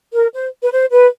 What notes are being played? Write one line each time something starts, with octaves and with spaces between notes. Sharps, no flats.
A#4
C5
B4
C5
B4